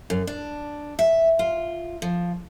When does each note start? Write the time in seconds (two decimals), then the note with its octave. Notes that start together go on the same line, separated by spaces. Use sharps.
0.10 F#2
0.27 D4
0.99 E5
1.39 F4
2.02 F3